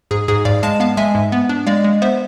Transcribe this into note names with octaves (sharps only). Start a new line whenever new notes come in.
G#2 G#4
G#2 G#4
G#2 D5 F5
G#3 F5 A5
B3 F5 A5
G#3 E5 G#5
G#2
B3
D4
G#3 D5 F5
G#3
B3 C5 E5